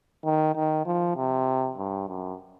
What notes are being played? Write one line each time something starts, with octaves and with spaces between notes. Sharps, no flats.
D#3
D#3
F3
C3
G2
F#2